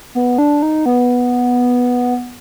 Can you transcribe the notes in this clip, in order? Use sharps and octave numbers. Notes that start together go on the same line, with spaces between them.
B3
D4
D#4
B3